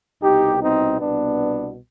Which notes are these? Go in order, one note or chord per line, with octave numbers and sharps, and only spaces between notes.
C2 B2 D#4 G4
C4 D#4
C2 B2 B3 D4